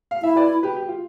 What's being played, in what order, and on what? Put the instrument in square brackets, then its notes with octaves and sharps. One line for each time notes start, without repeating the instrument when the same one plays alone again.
[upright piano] F5
[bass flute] E4 [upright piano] E5
[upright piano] B4 D5
G4 B4
G4
F4